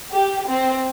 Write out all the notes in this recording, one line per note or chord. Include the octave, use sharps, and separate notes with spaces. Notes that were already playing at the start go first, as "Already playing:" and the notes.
G4
C4